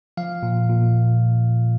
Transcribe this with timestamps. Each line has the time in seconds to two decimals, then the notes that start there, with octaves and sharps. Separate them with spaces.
0.17 F3 F5
0.43 A#2
0.69 A#2